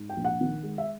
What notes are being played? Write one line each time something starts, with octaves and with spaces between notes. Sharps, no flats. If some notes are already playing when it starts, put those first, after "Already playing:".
Already playing: G#2
G5
A#1
F#5
D#3
G#3
E5